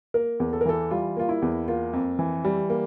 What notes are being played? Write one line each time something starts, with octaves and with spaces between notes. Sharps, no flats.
A#3 A#4
E2
A4
A#4
E3 A4
G3 F4
A#3 F4
E4
E2
A#3 F4
F2
E3
G3
A#3